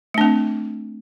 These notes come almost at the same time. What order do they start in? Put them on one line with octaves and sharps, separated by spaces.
A3 D4 C4